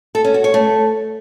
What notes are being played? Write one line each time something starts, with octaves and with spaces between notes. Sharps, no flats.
A4
C#4
F#4
C#5
A3